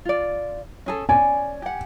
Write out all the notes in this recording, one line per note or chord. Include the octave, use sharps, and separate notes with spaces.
F4 D5
C#4 G#4 A4
C#4 D5 G#5
G4 F#5